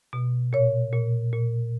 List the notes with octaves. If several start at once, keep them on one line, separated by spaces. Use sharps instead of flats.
B2
A#2 C#5
A#2
A#2